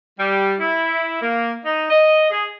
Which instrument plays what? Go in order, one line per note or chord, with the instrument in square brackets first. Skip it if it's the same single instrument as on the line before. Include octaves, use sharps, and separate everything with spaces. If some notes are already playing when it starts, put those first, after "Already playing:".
[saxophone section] G3
E4
A#3
D#4
D#5
G#4